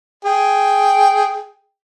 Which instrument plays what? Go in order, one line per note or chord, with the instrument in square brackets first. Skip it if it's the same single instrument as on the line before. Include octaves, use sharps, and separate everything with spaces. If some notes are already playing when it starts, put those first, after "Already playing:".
[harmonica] G#4 G5